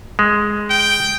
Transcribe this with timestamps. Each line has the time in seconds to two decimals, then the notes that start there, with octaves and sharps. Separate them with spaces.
0.19 G#3
0.71 G5